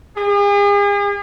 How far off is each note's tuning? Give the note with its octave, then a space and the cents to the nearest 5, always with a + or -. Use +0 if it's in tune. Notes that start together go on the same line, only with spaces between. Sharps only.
G#4 -40